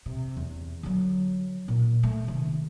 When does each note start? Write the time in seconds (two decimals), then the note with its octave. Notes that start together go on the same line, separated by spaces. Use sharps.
0.06 C3
0.37 E2
0.83 D3 F#3
1.68 A#2
2.03 A3
2.24 C3 D#3